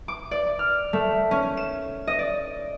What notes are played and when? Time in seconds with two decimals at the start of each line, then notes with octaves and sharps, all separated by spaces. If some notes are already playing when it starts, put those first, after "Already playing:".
0.08 D6
0.31 D5
0.59 F6
0.93 A3
1.31 C#4
1.57 E7
2.07 D#5
2.19 D5